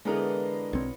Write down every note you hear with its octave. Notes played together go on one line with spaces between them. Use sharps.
D3 E3 G#3 B3 D4 A#4
B1 C4 C#5